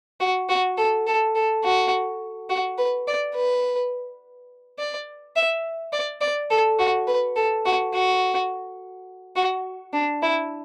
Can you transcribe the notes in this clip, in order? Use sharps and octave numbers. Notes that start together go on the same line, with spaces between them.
F#4
F#4
A4
A4
A4
F#4
F#4
B4
D5
B4
D5
E5
D5
D5
A4
F#4
B4
A4
F#4
F#4
F#4
D4
E4